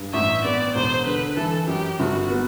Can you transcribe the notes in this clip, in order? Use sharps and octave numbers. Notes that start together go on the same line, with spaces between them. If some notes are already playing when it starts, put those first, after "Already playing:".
Already playing: G2
A1 E5
B3 D5
E1 C5
D3 B4
E3 A4
F#2 G4
G1 F#4
B3